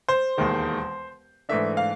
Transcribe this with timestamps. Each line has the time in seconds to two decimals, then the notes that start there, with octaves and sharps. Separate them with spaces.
0.09 C5
0.37 E1 D#2 D#3 G#3
1.49 G#2 E3 A3 D4 E5
1.77 F5